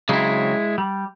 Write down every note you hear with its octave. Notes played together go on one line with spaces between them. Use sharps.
C#3 F#3 G#3 C4 E4
G3